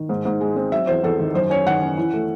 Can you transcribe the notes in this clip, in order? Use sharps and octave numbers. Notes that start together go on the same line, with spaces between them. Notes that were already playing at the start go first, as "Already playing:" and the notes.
Already playing: D#3
G#2
G#2
G#3
C4
F#3 E5
E2 C5
E2 A4
D#3
F#2 C5
C#4 C#5
D#3 F#5
C#4
E3
A3